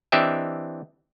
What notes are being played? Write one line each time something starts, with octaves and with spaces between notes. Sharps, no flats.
E3 C4 D4 G4 D#5 E5